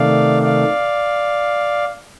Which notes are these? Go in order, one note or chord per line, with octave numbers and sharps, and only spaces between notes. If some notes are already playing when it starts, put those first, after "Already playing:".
Already playing: C3 D#3 A3 D5 F5
D5 F5